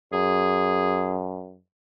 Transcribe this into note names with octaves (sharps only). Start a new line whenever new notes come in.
F#2 G#4